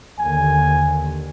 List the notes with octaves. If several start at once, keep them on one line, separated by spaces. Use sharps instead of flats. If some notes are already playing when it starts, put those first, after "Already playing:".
D#2 D3 G#5